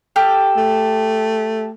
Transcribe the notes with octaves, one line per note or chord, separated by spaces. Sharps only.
G4 A4 F6
A3